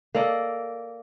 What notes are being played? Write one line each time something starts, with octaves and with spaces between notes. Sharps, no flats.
A#3 A4 D5 D#5